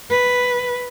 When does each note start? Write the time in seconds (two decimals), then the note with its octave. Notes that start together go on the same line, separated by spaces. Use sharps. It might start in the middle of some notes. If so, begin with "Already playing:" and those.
0.10 B4